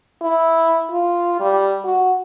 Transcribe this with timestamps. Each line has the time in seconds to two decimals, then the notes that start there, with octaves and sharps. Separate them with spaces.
0.22 E4
0.91 F4
1.40 G3
1.84 F#4